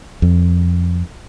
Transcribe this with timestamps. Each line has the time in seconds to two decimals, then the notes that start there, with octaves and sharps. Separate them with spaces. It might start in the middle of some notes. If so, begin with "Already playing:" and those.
0.22 F2